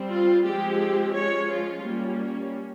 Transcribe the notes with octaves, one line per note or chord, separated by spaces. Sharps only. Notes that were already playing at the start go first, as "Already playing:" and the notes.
Already playing: G3 C4
F4
F3 G#3 C4 G4
F3 G#3 C#4 C#5
F4
G3 A#3 C#4